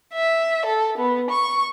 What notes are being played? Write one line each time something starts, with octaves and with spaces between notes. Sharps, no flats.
E5
A4
B3
C#6